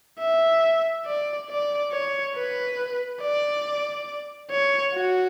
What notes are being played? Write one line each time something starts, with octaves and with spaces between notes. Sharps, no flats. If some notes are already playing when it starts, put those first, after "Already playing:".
E5
D5
D5
C#5
B4
D5
C#5
F#4